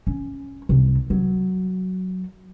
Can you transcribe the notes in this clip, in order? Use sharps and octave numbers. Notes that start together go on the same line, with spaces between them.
C#4
C2
F#3